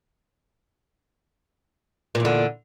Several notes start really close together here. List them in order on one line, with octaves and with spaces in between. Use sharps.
A#2 E2 D3